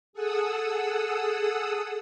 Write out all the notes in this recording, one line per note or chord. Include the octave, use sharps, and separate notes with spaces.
G#4 A4 F#5 D#6 E6